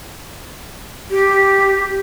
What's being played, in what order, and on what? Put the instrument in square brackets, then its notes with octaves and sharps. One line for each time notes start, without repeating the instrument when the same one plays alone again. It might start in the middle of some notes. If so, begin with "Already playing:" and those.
[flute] G4